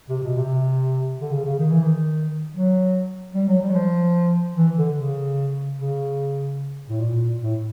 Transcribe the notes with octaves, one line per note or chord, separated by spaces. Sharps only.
C3
B2
C3
D3
C#3
C#3
D#3
E3
D#3
F#3
G3
F#3
G3
F#3
F3
E3
D3
C#3
C#3
A2
A#2
A2